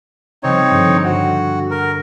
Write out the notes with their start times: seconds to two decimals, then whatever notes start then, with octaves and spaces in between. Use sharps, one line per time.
0.43 C#3 F3 G3 C4 D#4 C#5
0.70 G2 D3
1.04 F#4
1.71 A#4